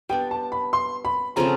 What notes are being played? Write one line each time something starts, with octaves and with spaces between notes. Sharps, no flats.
G3 B3 D4 G5
A5
B5
C6
B5
C#3 F3 A3 C4 A#5